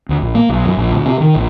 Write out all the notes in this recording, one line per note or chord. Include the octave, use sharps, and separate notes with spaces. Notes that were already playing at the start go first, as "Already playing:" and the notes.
D2
A#1
A#3
B1
F#2
A#1
D2
C3
D#3
A#1